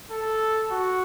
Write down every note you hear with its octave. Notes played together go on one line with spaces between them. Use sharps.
A4
F#4